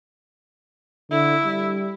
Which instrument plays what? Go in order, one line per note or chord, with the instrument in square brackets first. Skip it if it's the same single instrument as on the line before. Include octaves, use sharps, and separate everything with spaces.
[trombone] D3 [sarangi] E4
[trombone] G3